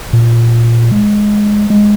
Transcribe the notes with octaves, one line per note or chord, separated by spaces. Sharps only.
A#2
G#3
G#3